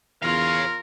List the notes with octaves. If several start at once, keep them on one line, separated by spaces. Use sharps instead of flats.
E2 F4 A#4 C#5 F5